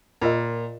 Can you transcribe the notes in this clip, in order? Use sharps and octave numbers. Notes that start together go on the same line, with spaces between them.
A#2 F4 A#4 D#5